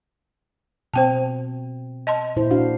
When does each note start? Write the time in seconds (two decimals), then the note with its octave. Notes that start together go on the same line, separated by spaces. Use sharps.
0.94 B2 C4 C5 G5 A5
2.07 D#5 A5 C6
2.36 A#2 E4 C5
2.51 D4 F#4 F5